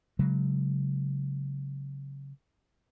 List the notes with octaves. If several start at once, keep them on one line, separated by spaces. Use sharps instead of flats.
C#3 F#3 G#3